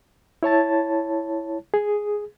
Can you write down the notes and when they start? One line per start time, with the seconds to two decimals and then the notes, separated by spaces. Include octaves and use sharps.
0.43 E4 C#5 A5 A6
1.74 G#4